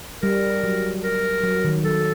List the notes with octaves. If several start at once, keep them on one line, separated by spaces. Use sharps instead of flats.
G3 A#4
F#3
A#4
F#3
D#3
F#3 A4